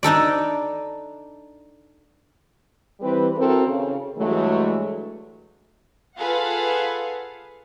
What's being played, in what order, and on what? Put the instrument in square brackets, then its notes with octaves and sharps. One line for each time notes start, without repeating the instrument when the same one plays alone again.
[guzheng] D4 D#4 A4 D5
[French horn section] E3 G3 C4 G4 B4
C4 E4 F#4 A4 A#4 C5
C#3
G2 E3 F#3 G#3 A3
[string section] F4 G#4 A4 B4 F5 F#5